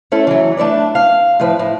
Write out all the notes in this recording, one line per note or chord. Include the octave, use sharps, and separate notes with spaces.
A3 C#4 E4 A4
E3 F#3
A3 D4 B4 D5
F5
A2 F3 B4
A2